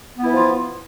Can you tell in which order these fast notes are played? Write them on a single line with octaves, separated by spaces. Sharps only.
B3 E4 E3 F3 F4